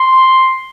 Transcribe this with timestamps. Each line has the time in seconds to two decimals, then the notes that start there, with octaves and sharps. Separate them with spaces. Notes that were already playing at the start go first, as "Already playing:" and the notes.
Already playing: C6